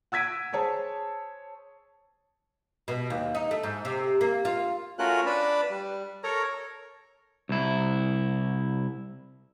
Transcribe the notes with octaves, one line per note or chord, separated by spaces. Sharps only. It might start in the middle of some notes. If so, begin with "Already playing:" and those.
F#5 E6 G#6 B6 D7 D#7
G#4 C5 C#5 A5
B2
D#2
D#4
A3
G#2
C3
A#3
F4
A3 C#4 F4 F#4 A#4 F#6
D4 B4 D5 A5 B5
G3
A4 A#4 C#5 A#5
C2 E4